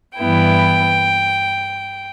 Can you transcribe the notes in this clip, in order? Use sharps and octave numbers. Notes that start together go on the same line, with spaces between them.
G2 E3 B3 E4 G5